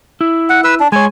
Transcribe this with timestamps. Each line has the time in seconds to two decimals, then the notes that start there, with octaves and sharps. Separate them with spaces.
0.21 E4
0.50 F#5
0.64 B4 E6
0.80 D4
0.92 G#3 C#5 G#5